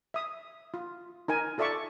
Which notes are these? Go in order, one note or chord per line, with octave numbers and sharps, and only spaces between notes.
E5 D#6
F4
D#4 A#4 G#5
F4 A4 D5 E5 A5 C#6